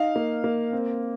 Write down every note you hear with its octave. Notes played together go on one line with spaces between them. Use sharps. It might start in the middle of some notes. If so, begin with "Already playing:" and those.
Already playing: D#4 F5
A#3
A#3
C4